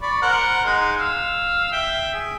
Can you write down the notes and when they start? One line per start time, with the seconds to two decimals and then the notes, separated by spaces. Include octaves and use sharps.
0.02 D5 B5 C#6
0.22 A#4 C5 F#5
0.65 G#3 D#4
0.98 F5 E6
1.72 E5 G5
2.14 G#4